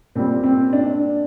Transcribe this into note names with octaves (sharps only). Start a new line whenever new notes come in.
A#2 G3 C4
C4
D4